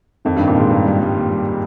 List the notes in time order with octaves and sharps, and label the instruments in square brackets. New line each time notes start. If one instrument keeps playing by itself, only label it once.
[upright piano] F2 [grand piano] D#3
[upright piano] G2 [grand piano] D#3
[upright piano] A#2
[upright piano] G#2 [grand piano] D#3
[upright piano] G2 [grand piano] G3
[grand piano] G3
G3
D#2
G3